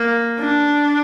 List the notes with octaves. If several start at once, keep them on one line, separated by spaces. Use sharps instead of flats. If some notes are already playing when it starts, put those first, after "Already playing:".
Already playing: A#3
D4